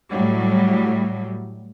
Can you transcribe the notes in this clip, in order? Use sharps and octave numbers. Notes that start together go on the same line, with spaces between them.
A2 F#3 G3